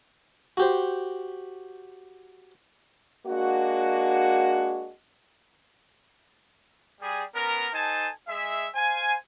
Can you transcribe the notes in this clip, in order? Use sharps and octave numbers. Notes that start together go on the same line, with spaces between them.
F#4 G4 C5
G#3 A#3 D4 F#4
G3 G#4
B3 C#4 A#4
D#4 A4 C5 G#5 A5
G#3 G#4 E5
C5 F5 G#5